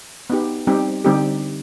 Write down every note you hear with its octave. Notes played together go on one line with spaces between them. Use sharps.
B3 D#4 G4
G3 C4 D#4 G4
D3 G3 C4 D#4 G4